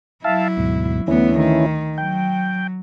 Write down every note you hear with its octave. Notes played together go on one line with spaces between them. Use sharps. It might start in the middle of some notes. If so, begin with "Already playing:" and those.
F#3 E4 E5 F5 A5
D2 G#2 B2
D2 E3 B3 C#4 E4
D#3
F#3 G5